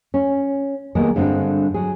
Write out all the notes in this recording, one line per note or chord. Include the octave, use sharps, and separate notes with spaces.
C#4
D#3 G3 G#3 A#3 B3
G2 D3 G3 G#3 C4
F#3 G#4